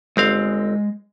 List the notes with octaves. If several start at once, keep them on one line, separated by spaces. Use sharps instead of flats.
G1 G#3 C4 D#5 F5